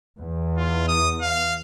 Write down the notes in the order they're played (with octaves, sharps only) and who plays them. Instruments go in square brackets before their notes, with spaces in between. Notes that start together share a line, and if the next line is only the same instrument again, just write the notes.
[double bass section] E2
[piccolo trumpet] F4
D#6
F5